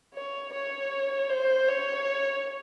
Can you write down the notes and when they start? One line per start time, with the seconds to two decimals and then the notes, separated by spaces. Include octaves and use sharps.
0.14 C#5
0.53 C#5
1.30 C5
1.69 C#5